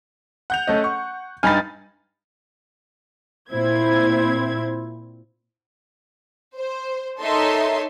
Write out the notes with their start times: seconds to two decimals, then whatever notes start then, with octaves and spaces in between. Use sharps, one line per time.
0.50 F#5 G6 F7
0.67 A3 C#4 D#5
0.84 C#6
1.43 G2 D#4 G#5 B5 F6 A6
3.52 A#2 C4 E4 C5 G#6
6.57 C5
7.21 D#4 A4 A#4 C#5 E5 C6